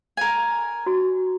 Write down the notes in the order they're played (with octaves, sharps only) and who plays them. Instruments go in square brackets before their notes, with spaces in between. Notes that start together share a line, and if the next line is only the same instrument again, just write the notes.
[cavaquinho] A#4 G#5
[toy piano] F#4